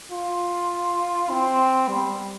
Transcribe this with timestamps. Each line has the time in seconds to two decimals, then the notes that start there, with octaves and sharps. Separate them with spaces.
0.11 F4
1.30 C4
1.88 G3